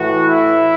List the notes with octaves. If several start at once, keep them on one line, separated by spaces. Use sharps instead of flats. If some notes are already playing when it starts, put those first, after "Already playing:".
Already playing: A2 E3 F#4
E4